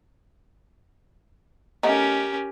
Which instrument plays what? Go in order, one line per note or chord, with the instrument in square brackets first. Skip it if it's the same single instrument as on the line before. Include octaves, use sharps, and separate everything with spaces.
[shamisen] A3 B3 D#4 [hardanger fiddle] C#4 [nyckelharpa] G4 A#4